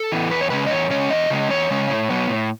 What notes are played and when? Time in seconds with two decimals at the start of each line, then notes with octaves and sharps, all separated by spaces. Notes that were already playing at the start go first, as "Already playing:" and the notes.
Already playing: A4
0.12 E3 B3
0.30 E2 B4
0.41 C#5
0.50 C#3 G#3 C#4 B4
0.67 D#5
0.71 E2 C#5
0.90 C#3 G#3 C#4 C#5
1.11 E2 D#5
1.30 C#3 G#3 C#4
1.50 E2 C#5
1.70 C#3 G#3 C#4
1.89 A2
2.10 F#3 B3
2.29 A2